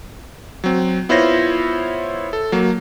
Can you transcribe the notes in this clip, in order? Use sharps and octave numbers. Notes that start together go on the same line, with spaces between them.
F#3 C4
B3 E4 F4 C5 C#5 A#6
A4
F#3 A#3